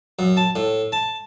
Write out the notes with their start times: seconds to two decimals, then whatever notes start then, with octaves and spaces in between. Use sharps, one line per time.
0.19 F#2
0.37 A5
0.56 A2
0.92 A5